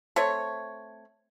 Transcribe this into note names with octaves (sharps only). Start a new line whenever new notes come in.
A3 C4 C#5